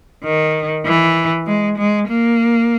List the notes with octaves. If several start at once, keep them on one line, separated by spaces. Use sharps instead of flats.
D#3
E3
G#3
G#3
A#3